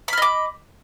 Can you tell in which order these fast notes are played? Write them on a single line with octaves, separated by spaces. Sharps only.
B5 F6 D#5 D6